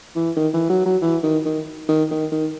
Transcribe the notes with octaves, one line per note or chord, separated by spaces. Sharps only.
E3
D#3
E3
F#3
F#3
E3
D#3
D#3
D#3
D#3
D#3